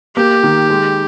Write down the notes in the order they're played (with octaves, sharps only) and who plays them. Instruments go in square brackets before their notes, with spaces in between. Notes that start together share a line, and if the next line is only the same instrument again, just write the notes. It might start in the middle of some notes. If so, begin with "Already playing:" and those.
[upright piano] A#3 [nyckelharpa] G4
[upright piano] D#3
G#3